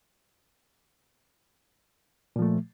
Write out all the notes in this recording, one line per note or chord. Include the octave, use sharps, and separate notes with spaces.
A#2 F3 A3